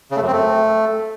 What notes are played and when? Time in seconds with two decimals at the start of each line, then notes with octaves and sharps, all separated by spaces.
0.11 C#3
0.17 A3
0.22 F#2
0.27 C4
0.33 A3